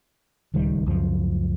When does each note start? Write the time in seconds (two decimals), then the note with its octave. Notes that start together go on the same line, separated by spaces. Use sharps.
0.54 D1 C#2 D#3 G3
0.86 C#2 F#2 F3